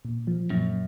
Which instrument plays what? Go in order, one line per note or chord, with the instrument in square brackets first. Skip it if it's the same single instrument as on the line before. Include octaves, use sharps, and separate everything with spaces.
[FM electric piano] A#2
F3
[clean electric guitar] F#2 [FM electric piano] A#2